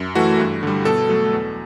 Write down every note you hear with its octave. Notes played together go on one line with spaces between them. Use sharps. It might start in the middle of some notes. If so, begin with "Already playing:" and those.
Already playing: F#2
E3 A3 F#4
G2
D3 G3
B2 A4
F#3 A3
E2